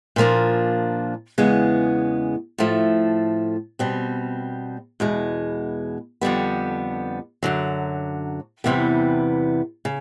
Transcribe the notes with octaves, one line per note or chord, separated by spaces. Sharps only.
A#2 F3 A#3 D4
E2 C#3 E3 G#3 B3
A2 F3 A3
B2 G3 C4
E2 B2 G#3
F2 D3 G3 B3
F#2 D3 F#3
E2 C3 E3 G3 B3
C#3